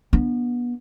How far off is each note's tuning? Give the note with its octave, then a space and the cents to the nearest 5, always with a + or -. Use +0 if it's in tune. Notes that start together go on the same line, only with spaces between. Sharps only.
B3 -25 D4 +0